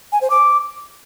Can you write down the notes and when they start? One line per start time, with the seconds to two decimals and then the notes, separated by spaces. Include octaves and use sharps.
0.12 G#5
0.21 C5
0.30 D6